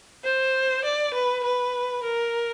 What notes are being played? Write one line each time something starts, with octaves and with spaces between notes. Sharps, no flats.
C5
D5
B4
B4
A#4